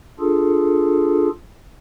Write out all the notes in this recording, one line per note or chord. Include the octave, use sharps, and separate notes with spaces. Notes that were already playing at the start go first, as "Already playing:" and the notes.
D4 F4 G#4 A4